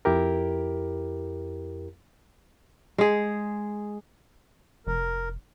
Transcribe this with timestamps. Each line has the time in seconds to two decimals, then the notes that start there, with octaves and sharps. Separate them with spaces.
0.05 F2 E4 G4 A#4
2.98 G#3 G#4
4.87 F1 A#4